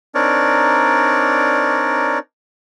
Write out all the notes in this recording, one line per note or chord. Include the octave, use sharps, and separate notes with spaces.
C4 D4 D#4 A#4 C#5 D5